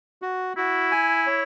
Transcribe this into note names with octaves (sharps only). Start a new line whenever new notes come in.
F#4
E4 F#4
G#5
C#5